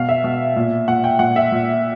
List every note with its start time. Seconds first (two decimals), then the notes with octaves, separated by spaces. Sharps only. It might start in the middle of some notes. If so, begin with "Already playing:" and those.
Already playing: B2 F5
0.09 E5
0.24 B2
0.56 A#2
0.88 A#2 F#5
1.04 G5
1.19 A#2 F#5
1.36 E5
1.52 A#2